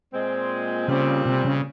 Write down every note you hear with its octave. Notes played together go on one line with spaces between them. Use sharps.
A#2 G#3 C4
A#2 C#3 G3 C4
C3
C#3